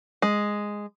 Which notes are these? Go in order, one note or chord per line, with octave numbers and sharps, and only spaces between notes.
G#3